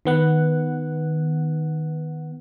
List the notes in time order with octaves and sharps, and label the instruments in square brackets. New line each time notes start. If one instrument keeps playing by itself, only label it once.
[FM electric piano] D#3 B3 F#5